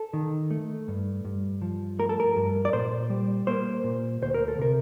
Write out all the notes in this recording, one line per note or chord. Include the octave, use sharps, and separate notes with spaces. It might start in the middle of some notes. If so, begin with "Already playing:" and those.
Already playing: A4
D#3
A3
G2
G2
F3
A3 A#4
A4
A#4
G2
D5
A#2 C5
G3
A#3 C5
A#2
D2 C5
A#4
A4
C3 A#4